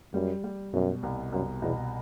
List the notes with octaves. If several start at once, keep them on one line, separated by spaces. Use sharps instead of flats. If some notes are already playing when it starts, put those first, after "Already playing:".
F#2 G3
G3
F#2 B2
C2
C2 F#2
E2 B2